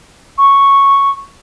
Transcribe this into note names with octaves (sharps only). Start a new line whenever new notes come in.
C#6